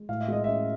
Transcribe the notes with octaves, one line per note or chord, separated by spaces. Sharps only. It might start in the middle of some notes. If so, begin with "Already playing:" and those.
Already playing: G#3
A2 F5
E5
G#3 D#5
C#4 E5